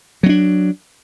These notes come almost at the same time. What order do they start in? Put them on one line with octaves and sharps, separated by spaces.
F#3 C4 D4